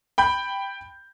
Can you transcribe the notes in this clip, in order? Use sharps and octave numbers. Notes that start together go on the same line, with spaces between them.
G5 B5 G6